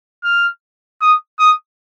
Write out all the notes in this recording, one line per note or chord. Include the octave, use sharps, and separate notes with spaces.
F6
D#6
D#6